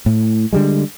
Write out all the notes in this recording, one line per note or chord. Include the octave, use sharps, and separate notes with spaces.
A2
D3 G3 G#3